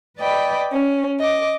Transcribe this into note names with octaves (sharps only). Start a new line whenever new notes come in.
B4 D5 D#5 G5 B5
C#4
D#5 D6